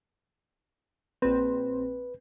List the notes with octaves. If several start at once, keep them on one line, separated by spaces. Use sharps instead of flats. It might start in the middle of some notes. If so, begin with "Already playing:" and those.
A#1 C4 B4